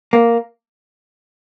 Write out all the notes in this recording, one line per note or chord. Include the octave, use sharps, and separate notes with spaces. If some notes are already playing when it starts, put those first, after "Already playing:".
A#3